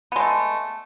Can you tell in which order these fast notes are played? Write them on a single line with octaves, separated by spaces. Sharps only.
B3 G#3 A3